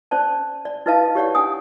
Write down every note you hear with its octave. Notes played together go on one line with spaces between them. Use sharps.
C#4 C5 D5 A5
D5
D#4 E4 B4 D#5 F5 A5
G4 C#5 D5 F#5
D4 F#5 G#5 D#6